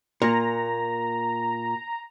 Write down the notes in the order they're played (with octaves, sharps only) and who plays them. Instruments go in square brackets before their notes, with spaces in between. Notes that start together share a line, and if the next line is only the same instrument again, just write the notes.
[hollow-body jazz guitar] A#2 [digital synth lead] A#5